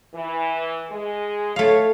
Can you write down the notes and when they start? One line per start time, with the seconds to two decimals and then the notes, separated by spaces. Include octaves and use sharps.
0.15 E3
0.91 G#3
1.56 A3 C#5 F5